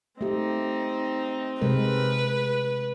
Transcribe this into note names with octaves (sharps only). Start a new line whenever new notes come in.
A3 C4 D#4 G4
C3 G#3 A#4 B4